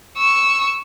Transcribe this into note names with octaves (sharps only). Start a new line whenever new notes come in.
C#6 E6